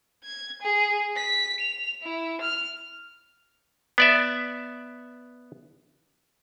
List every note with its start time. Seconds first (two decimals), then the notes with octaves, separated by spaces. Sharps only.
0.24 G#6
0.62 G#4
1.17 B6
1.60 F7
2.02 E4
2.41 F6
3.98 B3 D5 E5